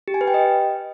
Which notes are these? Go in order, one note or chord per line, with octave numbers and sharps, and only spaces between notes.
G4
G#5
B4
G5
D#5